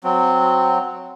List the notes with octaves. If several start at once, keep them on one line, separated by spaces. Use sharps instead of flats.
F#3 C4